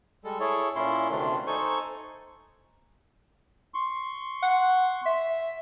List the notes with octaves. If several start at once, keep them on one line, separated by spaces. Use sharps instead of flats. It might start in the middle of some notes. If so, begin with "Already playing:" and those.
G3 G#3 A4
E4 G#4 A4 C#5
A#2 C#4 E4 C6
D2 C3 D#3 A3 D4 C6
D#4 A4 C5 G#5 C#6
C6 C#6
F#5
E5